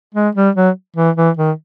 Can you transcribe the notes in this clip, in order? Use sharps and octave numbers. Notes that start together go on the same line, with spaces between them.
G#3
G3
F#3
E3
E3
D#3